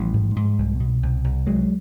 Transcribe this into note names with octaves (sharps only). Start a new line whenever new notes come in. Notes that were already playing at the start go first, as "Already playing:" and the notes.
Already playing: A1 F3 G3
G#2
G#2
C2
B2
C2
C2
C2 F#3 G#3